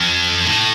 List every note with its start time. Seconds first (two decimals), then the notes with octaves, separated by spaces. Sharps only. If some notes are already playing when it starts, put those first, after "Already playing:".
Already playing: F2
0.46 A2